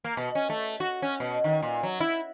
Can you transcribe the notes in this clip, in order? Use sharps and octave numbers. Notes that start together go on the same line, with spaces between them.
A#3
B2
C#4
A3
F#4
C#4
B2
D#3
A#2
F#3
E4